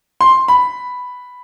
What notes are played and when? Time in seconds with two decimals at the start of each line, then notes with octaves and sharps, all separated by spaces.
0.21 C6
0.48 B5